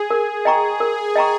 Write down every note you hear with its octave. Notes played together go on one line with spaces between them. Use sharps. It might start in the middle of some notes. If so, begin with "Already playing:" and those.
Already playing: G#4
A#4
D#5 G5 A#5 C#6
A#4
D#5 G5 A#5 C#6